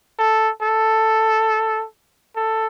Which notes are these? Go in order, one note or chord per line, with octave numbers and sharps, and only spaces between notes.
A4
A4
A4